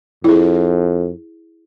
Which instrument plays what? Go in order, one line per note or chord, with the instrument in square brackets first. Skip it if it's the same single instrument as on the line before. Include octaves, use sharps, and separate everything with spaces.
[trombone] F2 [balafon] E4 G#4